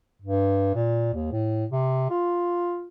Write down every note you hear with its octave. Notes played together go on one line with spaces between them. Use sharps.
G2
A#2
D#2
A2
C3
F4